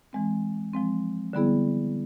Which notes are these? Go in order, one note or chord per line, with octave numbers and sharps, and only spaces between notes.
E3 G#3 C4
F3 G#3 C4
D3 G3 B3 E4 G#4